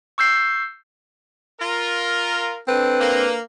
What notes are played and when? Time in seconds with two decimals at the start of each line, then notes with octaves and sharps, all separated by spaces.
0.18 C#6 E6 G6 C7
1.60 F4 A#4
2.68 C4 D4 A4 B4
2.99 A#3